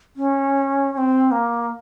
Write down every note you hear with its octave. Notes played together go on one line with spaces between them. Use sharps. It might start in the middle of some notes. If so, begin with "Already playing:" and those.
C#4
C#4
C4
A#3